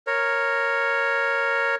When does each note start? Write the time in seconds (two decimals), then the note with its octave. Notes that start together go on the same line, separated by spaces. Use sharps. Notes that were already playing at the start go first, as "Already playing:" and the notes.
0.07 A#4 C#5